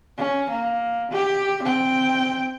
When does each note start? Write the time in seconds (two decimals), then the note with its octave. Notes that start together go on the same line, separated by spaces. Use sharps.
0.18 C#4
0.50 A#3
1.11 G4
1.63 C4 G5